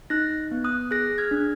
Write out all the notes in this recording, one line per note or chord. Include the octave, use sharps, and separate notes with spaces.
D#4 F#6 A#6
B3
D#6 F#6
G#4 F#6 A#6
F6 G#6
D4